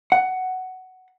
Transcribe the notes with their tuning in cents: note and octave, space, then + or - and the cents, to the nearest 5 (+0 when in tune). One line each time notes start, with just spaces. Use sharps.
F#5 +10